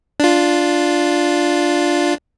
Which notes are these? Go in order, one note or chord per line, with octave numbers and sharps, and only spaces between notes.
D4 F4